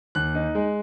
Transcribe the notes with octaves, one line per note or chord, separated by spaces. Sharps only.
D#2 F#6
D#4
G#3